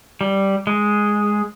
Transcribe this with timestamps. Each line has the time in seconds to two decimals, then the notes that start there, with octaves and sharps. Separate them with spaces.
0.21 G3
0.67 G#3